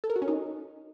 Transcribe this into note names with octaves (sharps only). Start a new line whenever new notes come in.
A4
A#4
F#4
C#4
D#4